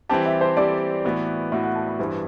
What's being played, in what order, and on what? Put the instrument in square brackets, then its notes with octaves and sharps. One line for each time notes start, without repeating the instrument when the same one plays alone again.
[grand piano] E3 G3 C4 G4 [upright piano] A5
[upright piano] E5
C5
[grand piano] E3 G3 C4 G4 [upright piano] D5
[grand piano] A2 E3 B3 F#4
[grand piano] A2 E3 B3 F#4 [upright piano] E5
[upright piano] F#5
A5
B5
[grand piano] G2 E3 G3 [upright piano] C5